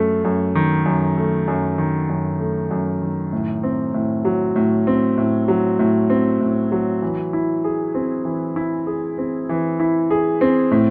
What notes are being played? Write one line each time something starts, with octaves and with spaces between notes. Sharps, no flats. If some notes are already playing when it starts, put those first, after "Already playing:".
Already playing: F#2 A3
F#2
D#3
F#2
A3
F#2
D#3
F#2
A3
F#2
D#3
A2
C4
A2
F#3
A2
C4
A2
F#3
A2
C4
A2
F#3
E3
E4
G#4
C4
E3
E4
G#4
C4
E3
E4
G#4
C4
A2